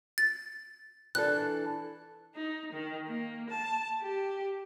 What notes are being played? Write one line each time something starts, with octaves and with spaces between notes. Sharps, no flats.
A6
E3 D4 A4 F#6
D#4
D#3
A#3
A5
G4